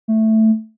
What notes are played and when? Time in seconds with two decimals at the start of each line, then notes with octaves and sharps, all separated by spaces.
0.08 A3